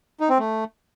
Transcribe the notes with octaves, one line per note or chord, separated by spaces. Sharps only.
D#4
C4
A3